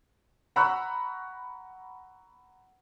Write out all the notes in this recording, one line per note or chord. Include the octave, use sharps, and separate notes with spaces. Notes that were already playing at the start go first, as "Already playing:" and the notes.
F#5 A#5 B5 C#6 E6 F#6